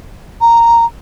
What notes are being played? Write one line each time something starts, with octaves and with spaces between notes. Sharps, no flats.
A#5